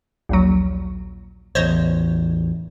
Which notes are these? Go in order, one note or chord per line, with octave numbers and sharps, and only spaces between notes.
A#1 D#2 F#3
A1 E2 C5 C#5 D#5